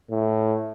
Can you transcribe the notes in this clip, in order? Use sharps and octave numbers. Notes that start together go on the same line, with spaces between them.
A2